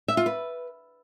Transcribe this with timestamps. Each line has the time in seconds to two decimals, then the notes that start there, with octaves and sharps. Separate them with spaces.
0.08 E5
0.17 F4
0.26 B4